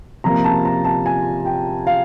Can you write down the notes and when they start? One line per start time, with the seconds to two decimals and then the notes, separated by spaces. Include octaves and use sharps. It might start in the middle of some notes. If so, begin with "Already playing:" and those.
0.24 C3 F3 A#3 A#5
0.44 A5
0.65 A#5
0.85 A5
1.06 G#5
1.45 G5
1.87 F5